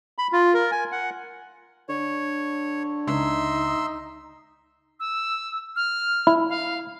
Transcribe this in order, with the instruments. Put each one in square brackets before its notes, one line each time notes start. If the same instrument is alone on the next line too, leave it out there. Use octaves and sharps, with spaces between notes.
[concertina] B5
F4
A#4
G#5
F#5
[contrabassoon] D3 [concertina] C#5
[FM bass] C#2 [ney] D#4 [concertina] E5 C6 E6
[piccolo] E6
F6
[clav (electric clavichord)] E4
[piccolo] F5